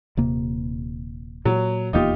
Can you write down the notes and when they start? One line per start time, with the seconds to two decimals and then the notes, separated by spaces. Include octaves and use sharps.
0.17 D#1 C3 A#3
1.45 A#2 F#3
1.93 D#1 E2 A#3 D#4 F4 G4